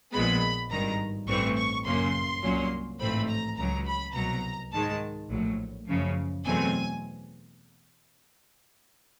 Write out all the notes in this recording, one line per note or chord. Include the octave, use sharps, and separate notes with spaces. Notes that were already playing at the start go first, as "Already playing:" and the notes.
A#1 A#2 F3 G#3 B3 B5
G#1 G2 D#3 A#5
A1 G2 E3 A3 C4 C#6
C#6
F#2 C#3 F#3 A#3 C#4 C6
C2 A#2 F#3 A#3 C#4
A1 G#2 F3 A3 C4 B5
A#5
C#2 C#3 F#3 A#5
B5
C2 B2 F#3 A#5
G#2 D#3 G#3 A5
A#1 A2 F#3
F#2 C#3 F3
E2 B2 F#3 A3 C4 G#5